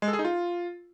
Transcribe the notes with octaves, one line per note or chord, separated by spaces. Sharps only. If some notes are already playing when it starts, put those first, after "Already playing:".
G#3
A4
G#4
D#4
F4